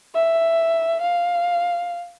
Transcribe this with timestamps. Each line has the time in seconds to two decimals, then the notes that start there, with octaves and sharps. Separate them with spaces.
0.14 E5
1.02 F5